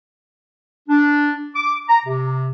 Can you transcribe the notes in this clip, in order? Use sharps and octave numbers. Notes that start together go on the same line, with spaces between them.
D4
D6
A#5
C3